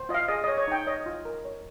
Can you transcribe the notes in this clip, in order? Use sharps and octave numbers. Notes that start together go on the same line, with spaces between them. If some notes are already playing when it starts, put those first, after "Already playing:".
Already playing: C5
F4 D#5
F5
G#4 D#5
C#5 D#5
C#5
D#4 G5
C#5 D#5
F4
A#4
C#5